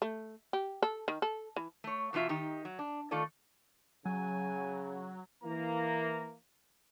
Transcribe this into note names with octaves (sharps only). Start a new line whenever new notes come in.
A3
G4
A4
D#3
A4
E3
A3 C#5
E2 B2 D3 F4 E5
D#3 D#4 G4
F#3
D4
D#3 A3 F4 A4 D5
C#3 F#3 G#5
E3 A#3 A#5